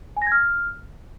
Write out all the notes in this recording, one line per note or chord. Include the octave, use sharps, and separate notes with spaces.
G#5
A#6
G#6
F6